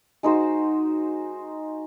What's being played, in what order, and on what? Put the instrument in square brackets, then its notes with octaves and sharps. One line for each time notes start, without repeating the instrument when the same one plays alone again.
[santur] G#3 D#4 F#4 C5